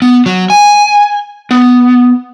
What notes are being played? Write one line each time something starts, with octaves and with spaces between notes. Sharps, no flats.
B3
F#3
G#5
B3